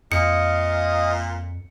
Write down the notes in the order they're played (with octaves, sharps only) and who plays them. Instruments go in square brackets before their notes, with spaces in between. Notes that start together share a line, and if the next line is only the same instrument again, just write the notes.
[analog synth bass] F2 [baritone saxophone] A#2 [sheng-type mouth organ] D#5 F5 D#6 [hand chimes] C#7